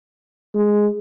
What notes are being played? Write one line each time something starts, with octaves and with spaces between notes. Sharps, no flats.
G#3